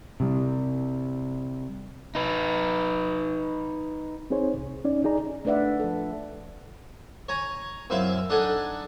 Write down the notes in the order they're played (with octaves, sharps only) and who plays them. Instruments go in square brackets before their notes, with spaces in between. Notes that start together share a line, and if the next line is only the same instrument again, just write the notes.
[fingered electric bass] C3 G3
[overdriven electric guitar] D#4 B4
[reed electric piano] C4 D#4 G#4 C5 C#5
C2
C#4 D#4 D5
D#4 G#4 D5 A#5
[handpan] A3 D4 B4 D5 E5 F#5
F3 A4
[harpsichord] C#5 G#5 A#5
F#2 C4 E4 E5 F5
D4 D#4 A4 F#5 G#5